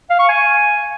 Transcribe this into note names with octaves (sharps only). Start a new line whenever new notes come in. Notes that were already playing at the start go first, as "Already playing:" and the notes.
F5
C#6
G#5